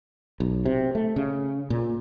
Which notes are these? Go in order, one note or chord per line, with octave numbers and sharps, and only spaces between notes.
B1
C3
A3
C#3
A#2